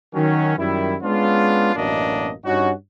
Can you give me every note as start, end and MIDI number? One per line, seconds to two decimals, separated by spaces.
0.14 0.55 51
0.14 0.55 54
0.14 0.55 61
0.58 0.95 42
0.58 0.95 51
0.58 0.95 55
0.58 0.95 64
1.02 1.76 56
1.02 1.76 59
1.02 1.76 61
1.02 1.76 62
1.02 1.76 65
1.76 2.32 33
1.76 2.32 42
1.76 2.32 47
1.76 2.32 58
1.76 2.32 62
1.76 2.32 75
2.45 2.71 43
2.45 2.71 61
2.45 2.71 63
2.45 2.71 66